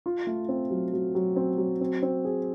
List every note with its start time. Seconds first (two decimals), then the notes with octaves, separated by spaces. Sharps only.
0.06 F4
0.27 A3
0.49 C4
0.70 F#3
0.93 F#3
1.15 F#3
1.36 C4
1.58 F#3
1.81 C4
2.03 C4
2.25 G#4